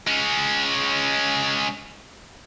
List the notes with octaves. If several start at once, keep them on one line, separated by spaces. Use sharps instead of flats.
G#3 C#4